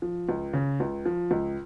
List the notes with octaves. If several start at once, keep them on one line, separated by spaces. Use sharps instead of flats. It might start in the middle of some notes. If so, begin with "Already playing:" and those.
F3
C#2
C#3
C#2
F3
C#2